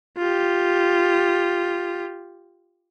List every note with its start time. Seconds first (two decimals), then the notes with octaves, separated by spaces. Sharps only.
0.18 F4 G4